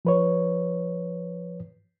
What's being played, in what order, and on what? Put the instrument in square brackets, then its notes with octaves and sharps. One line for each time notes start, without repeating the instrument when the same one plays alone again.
[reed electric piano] F3 B4 C#5